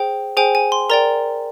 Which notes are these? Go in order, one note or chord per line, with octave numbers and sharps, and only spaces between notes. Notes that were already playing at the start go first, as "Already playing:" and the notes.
Already playing: G#4 C5 G5
G#4 C5 G5 G#5
G#5
C6
A#4 D5 G5 A#5